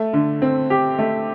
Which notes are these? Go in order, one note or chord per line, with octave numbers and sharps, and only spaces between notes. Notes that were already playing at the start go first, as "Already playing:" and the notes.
Already playing: A3
D3
C4
G4
A3